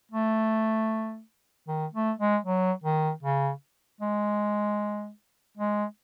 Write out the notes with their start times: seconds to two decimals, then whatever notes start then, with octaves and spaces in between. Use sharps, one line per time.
0.12 A3
1.68 D#3
1.93 A3
2.19 G#3
2.45 F#3
2.84 D#3
3.23 C#3
4.01 G#3
5.57 G#3